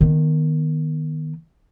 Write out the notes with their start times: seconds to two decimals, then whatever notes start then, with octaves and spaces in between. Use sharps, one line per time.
0.01 D#3 B3